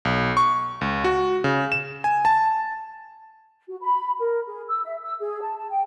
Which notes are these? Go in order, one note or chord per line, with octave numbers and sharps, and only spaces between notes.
B1
C#6
C#2
F#4
C#3
E7
G#5
A5
F#4
B5
A#4
G#4
E6
E5
E6
G#4
A5
A5
G5